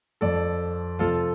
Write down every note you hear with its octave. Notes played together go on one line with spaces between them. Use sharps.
F2 F3 A4 D5
F2 C3 F3 F4 A4